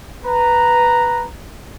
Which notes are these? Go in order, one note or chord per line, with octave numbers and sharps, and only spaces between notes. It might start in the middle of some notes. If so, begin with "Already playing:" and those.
B4 A#5